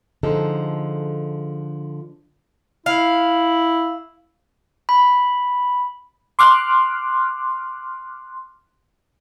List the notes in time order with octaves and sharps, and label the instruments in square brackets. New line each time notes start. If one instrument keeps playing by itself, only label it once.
[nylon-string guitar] D3 F3 G#3 D#4 A4
[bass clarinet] E4 [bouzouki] F5
[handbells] B5
[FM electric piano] C6 D6 F6 F#6